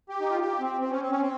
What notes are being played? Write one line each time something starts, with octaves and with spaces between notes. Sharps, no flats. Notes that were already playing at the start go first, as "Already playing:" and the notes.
G4
D#4
F4
G4
C4
C4
C#4
C4
C#4
C4